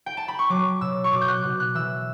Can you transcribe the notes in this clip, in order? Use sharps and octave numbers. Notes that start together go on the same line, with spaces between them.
G5
A5
B5
C#6
F#3 D6
B2 E6
C#6
B2 D6
G6
F#6
B2
F#6
E3 E6